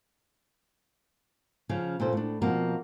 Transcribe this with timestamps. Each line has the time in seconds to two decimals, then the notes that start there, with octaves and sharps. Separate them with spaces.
1.69 C#3 F3 C#4
2.00 A#2 C#3 A4 C5
2.13 A2 D4
2.42 B2 F3 A#3 C4 A#4